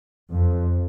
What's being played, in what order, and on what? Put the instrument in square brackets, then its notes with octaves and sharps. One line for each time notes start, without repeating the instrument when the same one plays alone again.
[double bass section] F2